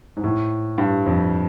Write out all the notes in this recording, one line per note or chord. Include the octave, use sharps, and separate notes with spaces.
G#2
A2
G2
F2